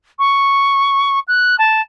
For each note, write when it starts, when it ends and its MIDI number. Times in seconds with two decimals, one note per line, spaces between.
0.19 1.19 85
1.28 1.56 90
1.59 1.81 81